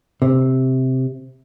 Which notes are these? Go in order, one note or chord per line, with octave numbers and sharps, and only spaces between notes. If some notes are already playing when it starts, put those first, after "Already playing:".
C3